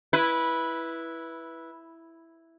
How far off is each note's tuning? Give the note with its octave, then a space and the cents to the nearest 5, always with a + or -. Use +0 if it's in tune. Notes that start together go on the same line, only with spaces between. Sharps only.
E4 +0 B4 -10